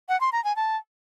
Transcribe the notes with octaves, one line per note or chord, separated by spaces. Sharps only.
F#5
C6
A#5
G#5
A5